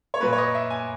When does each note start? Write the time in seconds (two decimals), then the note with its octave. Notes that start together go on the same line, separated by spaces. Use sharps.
0.14 C#5
0.20 A#2 F#3 A#3 B4
0.33 C#5
0.38 D#5
0.54 E5
0.70 G#5